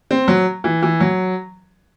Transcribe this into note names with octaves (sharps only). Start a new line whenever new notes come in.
C4
F#3
E3
E3
F#3